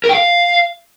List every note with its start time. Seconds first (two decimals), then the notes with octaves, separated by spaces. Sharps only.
0.04 A#4
0.09 G5
0.15 F5